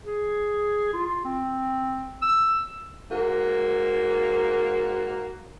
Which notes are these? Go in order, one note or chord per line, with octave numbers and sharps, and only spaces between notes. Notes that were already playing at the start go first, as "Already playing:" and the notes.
G#4
F4
C4
E6
G#2 A#3 F#4